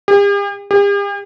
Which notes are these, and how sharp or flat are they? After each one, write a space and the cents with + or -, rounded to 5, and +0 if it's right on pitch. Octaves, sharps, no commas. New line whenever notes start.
G4 +45
G4 +45